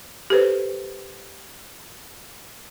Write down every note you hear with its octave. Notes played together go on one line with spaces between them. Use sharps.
G4 A4 B4 C5